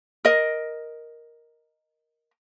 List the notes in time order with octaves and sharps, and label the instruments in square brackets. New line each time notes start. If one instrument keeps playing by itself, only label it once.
[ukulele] A#4 D#5